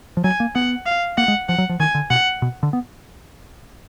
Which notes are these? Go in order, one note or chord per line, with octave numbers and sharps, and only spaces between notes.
F3
F#3 G#5
A#3
B3 F#5
F5
A#3 F#5
G#3
F3 F#5
F#3
F3
D#3 G#5
D3
B2 F#5
B2
D3
B3